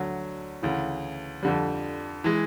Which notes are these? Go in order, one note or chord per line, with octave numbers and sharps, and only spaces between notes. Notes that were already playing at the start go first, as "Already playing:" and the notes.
Already playing: D2 D3 F#3
D2 C#3 E3
F2 D3 G3
E3 G#3